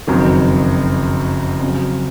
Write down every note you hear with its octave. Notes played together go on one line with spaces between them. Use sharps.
F#1 F2 D#3 F#3
F2 C#3 F#3